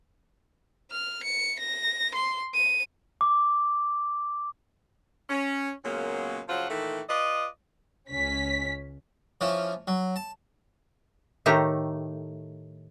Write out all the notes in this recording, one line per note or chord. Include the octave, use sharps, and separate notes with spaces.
F6
C#7
A#6
C6
D#7
D6
C#4
A#2 C#3 F#3 G#3 A#3 B3
C#3 F3 F#3 F4 C5 F#5
A#2 D#3 E3 A3 A4
F4 B4 D5 D#5
C#2 C#4 B6
E3 F3 C#4 F4
F#3
A5
A2 D#3 A3 G4 A#5